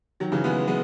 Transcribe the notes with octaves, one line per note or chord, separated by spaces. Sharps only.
D#3 F#3
C#3 E3
G#3 B3
G#3 B3